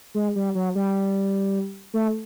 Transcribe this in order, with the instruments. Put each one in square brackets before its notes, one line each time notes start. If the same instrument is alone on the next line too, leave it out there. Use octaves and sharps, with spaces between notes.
[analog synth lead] G#3
G3
F#3
G3
A3